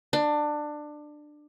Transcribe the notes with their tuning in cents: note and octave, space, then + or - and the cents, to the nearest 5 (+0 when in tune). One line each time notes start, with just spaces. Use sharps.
D4 +20